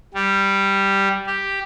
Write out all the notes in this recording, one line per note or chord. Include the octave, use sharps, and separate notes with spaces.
G3
G4